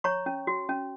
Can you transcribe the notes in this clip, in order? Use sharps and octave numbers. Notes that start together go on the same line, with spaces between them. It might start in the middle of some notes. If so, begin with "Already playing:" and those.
C#5 A#5 C#6
C#4
F#4
C#4